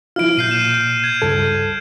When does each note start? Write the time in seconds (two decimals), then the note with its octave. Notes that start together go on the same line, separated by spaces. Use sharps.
0.16 F3 E4 F4 F6 D7
0.37 A#2 G6 C7 D#7
0.49 G6 E7
1.04 G#6
1.22 C#2 G2 A4